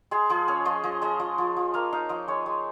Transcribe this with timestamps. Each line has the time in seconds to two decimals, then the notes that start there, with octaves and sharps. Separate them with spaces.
0.11 G#3 G#4
0.30 F3 G#4
0.48 C#4 C#5
0.65 F3 D#5
0.84 F3 D#5
1.02 G#3 D#5
1.19 F3 D#5
1.38 F3
1.57 F3
1.74 A#3 F5
1.93 D#4 F5
2.09 F3 D#5
2.28 G#3 C#5
2.46 G#3